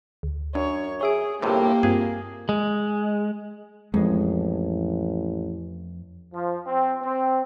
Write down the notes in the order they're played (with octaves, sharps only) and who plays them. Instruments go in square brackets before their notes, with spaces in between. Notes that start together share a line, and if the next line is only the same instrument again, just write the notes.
[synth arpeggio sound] D2
[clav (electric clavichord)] F#2 [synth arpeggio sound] D4 [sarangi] C#5
[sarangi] G#4 [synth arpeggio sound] C#5 E5 D7
[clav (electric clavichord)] G1 A2 C3 [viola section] A#3 [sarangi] G4
[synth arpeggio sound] G2 C4 F4 [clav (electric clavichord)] G#4
[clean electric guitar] G#3
[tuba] A1 [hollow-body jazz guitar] F2 [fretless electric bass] G#3
[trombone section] F3
C4
C4